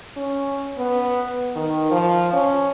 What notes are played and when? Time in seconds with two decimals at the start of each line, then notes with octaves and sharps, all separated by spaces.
0.17 C#4
0.78 B3
1.56 D#3
1.91 F3
2.33 C#4